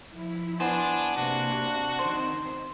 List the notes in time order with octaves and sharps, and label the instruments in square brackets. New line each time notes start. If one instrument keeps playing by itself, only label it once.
[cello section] F3 E4
[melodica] B3 G#5 [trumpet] D4 [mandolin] C5
[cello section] C3 A#3 [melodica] D4 [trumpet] F#4
[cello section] D#3 C4 [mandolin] C5